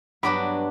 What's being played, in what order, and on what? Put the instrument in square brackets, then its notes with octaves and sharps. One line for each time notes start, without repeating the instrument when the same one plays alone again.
[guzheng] G2 F#3 B3 D4 [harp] B5 D6